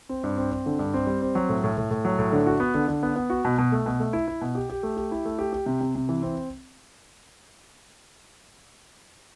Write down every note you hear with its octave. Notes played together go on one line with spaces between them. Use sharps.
C4
G2
C4
C4
D3
G2
C4
G3
C4
F#3
A2
A2
A2
A2
F#3
A2
D3
F#4
B3
D3
D3
B3
B3
F#4
B2
B2
A3
B2
A3
E4
E4
B2
G4
G4
A3
G4
E4
A3
G4
G4
C3
C3
C3
E3
C4